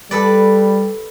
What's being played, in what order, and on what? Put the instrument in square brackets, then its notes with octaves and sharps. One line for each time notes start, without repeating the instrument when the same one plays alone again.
[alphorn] G3 [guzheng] A4 B4 D5